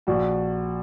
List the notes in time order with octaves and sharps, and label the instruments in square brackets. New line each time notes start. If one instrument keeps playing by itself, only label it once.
[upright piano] A#1 [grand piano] F#4